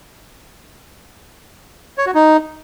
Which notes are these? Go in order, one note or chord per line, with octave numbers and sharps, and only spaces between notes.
C#5
F#4
D#4